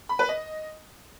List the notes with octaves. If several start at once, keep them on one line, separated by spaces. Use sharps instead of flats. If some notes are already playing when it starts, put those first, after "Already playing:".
B5
B4
D#5